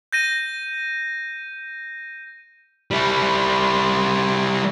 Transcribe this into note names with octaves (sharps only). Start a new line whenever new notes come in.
G6 A#6 D#7
G3 E4